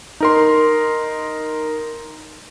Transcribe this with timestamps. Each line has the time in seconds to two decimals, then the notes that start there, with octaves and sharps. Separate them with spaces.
0.20 D#4 A#4 C6